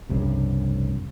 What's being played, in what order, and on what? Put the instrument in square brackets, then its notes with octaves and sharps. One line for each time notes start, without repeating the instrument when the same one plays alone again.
[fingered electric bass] F1 C2 G2 C#3